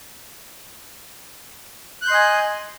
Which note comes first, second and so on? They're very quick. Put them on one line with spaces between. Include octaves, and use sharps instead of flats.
F#6 G6 C6 D#5 G#5